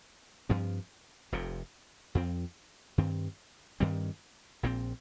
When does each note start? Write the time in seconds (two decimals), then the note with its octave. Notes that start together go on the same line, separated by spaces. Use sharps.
0.49 G2 F3 C4
1.32 F1 F2 C3
2.15 F2 F3 C4
2.98 G2 D#3 C4
3.80 G2 D#3 G3 C4
4.63 A#1 A#2 F3 C4